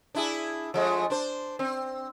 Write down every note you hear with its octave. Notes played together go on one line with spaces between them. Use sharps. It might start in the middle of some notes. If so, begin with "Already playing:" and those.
D4 E4 G#4
F3 G#3 A3
D4 C5
C4